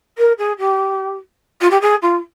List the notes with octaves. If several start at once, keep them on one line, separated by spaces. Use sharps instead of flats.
A#4
G#4
G4
F4
G4
G#4
F4